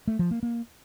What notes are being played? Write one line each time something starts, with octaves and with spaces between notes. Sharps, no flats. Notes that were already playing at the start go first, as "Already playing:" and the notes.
A3
F3
A#3
A#3